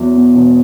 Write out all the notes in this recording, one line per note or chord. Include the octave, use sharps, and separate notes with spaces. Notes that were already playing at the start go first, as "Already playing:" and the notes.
Already playing: E2 F#3
B2
E1